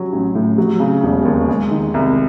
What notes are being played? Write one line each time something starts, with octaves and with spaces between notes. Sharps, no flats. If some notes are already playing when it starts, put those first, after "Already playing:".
Already playing: F#3 C#4
A1
A2
F#3
C#3
E1
D#2
G#3
D#3
C2